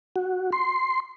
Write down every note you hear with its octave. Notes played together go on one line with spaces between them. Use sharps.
F#4
C6